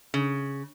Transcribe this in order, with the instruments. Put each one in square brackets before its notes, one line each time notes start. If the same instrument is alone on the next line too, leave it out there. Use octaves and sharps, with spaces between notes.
[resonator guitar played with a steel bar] C#3